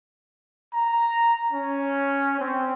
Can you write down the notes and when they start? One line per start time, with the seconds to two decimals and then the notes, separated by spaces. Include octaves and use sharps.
0.73 A#5
1.52 C#4
2.39 C4